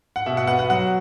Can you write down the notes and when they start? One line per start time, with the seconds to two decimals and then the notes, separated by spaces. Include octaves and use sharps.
0.16 F#5
0.26 B2 E5
0.37 F#5
0.47 B3 F#5
0.59 F#5
0.70 F#3 F#5